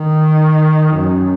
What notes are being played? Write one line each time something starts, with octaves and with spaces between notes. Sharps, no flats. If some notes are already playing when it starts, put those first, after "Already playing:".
Already playing: D#3
F#2